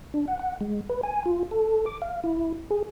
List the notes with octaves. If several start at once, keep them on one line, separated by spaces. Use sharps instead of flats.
D4
F#5
F#5
G#3
B4
G#5
F4
A4
D6
F5
E4
G#4